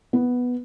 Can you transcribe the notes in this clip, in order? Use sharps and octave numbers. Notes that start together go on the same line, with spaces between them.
B3